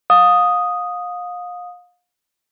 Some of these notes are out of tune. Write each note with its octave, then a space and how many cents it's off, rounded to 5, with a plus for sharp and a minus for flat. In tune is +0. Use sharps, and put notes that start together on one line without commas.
F5 +35 D#6 +0